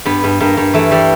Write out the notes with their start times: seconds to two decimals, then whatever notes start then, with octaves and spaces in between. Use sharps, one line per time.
0.05 G2 B3
0.24 G2
0.40 G2 A#3
0.57 G2
0.74 E3 A3
0.91 E3 G3